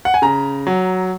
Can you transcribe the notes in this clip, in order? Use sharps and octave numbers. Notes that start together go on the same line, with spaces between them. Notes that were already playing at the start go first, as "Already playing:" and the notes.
F#5
G#5
C#3 A#5
F#3